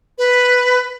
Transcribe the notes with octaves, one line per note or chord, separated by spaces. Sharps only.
B4